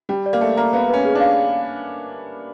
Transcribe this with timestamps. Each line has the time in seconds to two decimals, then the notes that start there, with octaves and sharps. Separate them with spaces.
0.09 G3 G5
0.26 D5
0.33 A#3
0.41 A3 D5
0.57 A#3 A#5
0.73 B3 F5
0.89 C#4 B4
1.05 G#4
1.15 D4
1.20 F5